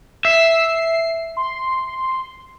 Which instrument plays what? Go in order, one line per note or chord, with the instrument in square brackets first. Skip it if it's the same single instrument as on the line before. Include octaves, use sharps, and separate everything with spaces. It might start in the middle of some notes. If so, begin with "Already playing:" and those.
[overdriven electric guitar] E5 [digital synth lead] C7
[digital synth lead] C6